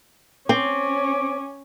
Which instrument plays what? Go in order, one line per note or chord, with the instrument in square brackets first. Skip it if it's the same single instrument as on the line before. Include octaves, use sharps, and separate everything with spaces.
[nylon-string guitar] C4 [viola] C#4 [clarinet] D6